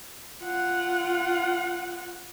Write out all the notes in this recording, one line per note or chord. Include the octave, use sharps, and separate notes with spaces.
F4 F#5